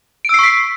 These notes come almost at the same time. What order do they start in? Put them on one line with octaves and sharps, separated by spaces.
D7 E6 C7 C#6 B6